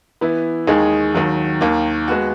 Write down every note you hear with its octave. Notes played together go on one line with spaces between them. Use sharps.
E3 B3 E4
D#2 D#3 G#3 D#4 G#4
D#2 D#3 F#3
D#2 D#3 A#3
G#3 B3 F#4